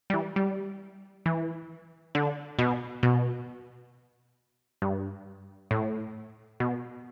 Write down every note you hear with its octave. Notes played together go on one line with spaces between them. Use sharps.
G3
E3
G3
E3
D3
B2
B2
G2
A2
B2